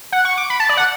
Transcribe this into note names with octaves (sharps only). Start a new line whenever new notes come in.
F#5
C#6
D6
B5
A5
D5
F#5